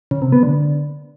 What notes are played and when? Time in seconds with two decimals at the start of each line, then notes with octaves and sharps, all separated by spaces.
0.11 C#3
0.22 C3
0.32 B3
0.43 D3